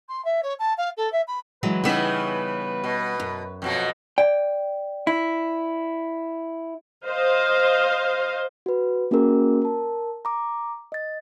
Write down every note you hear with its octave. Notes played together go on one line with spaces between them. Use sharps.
C6
E5
C#5
A5
F5
A4
E5
B5
E3 F#3 G#3 B4
C#3 E3 G3 B3 D#4 E5
B2
F#2
F2 B2 F#3
D5 G5
E4
C5 D#5 F5
F#4 B4
A#3 C#4 F#4 G#4 A#4
A#4 A5
A#5 D6
D#5 A6